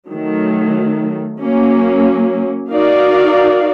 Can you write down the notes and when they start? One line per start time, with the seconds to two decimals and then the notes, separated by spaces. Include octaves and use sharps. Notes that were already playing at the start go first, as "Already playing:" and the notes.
0.11 D#3 F#3 A3
1.40 F#3 A#3 C#4
2.70 D#4 F#4 A#4 D5 F5